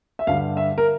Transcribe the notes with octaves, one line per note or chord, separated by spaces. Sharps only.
E5
G2 D3 G3 F5
E5
A#4